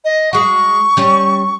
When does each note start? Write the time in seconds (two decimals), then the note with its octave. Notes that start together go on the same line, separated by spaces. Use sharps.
0.05 D#5
0.33 G#3 F#4 C#6
0.97 G3 C#4